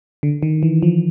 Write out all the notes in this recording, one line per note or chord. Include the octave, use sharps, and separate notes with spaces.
D3
D#3
E3
F3